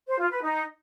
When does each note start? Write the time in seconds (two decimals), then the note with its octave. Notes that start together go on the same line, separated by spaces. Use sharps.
0.08 C5
0.19 F4
0.31 B4
0.42 D#4